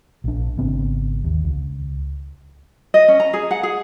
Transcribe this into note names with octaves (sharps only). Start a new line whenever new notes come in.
A#1 D4
G#1 C#3 B3 C4
D#2
C#2
D#5
C#4
A#5
G#4
F#5
G#4